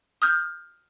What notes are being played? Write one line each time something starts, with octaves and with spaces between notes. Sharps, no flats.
D#6 F6 G6